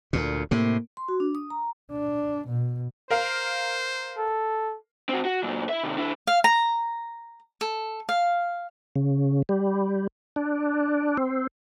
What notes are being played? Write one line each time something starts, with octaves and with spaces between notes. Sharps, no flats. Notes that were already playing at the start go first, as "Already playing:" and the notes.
D2 A#2
A2 C3 A#3
C6
F#4
D4
D#6
A#5
D4
B2
A#4 C5 F5
A4
C4 F#4
F#4
A#2 F#3
E4 E5
C3 D#3
D3 E4
F5
A#5
A4
F5
C#3
G3
D4
C4